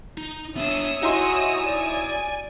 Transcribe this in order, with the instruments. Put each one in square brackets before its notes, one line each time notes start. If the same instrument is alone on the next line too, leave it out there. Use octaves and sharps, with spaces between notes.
[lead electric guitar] D#4
[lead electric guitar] B3 D4 [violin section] C#5 D#6 E6 [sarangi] E5
[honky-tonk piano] D#4 E4 C6 [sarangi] F#4 [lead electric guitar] G#5
[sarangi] D5